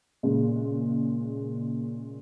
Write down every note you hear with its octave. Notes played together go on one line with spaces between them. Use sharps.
A#2 C#3 G#3